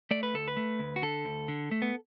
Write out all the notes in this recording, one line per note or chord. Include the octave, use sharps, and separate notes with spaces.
A3 D5
B4
D2 A4
B4
A3
D2
F#4
D3 A4
D2
D3
A3
B3